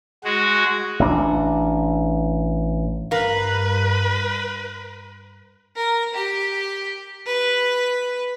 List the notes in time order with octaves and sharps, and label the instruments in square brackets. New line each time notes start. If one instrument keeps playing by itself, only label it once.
[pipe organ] G#3 F#4
[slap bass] A1 D4
[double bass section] G2 [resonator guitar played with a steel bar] A#4 F5 [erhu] B4
[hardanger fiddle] A#4
G4
B4